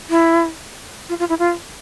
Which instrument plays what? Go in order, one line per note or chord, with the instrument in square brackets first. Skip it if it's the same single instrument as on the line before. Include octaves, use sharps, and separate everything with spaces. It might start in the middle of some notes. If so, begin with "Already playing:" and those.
[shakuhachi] E4
F4
F4
E4
F4